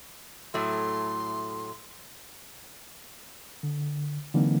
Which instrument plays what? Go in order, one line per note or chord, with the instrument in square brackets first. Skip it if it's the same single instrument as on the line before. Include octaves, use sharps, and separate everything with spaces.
[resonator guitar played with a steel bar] A2 F#3 A3 [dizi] C6
[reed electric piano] D3
D3 E3 F#3 A#3 C4 D#4